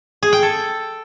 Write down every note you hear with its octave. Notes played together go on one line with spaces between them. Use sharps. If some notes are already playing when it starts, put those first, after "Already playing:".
G#4
G5
A4